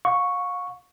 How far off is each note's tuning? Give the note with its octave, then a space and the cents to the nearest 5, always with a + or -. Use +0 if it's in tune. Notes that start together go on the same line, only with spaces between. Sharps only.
F5 +40 C#6 +0